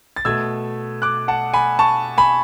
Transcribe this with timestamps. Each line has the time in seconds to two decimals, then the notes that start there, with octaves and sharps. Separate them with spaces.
0.16 A6
0.25 B2 A3 E6 G#6
1.02 D6 F#6
1.28 F#5 A5
1.54 G#5 B5
1.79 A5 C#6
2.18 G#5 B5